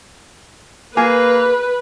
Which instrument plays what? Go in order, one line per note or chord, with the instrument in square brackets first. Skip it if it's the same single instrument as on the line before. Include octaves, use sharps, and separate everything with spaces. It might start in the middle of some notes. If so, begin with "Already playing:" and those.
[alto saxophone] A#3 [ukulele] G#4 [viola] B4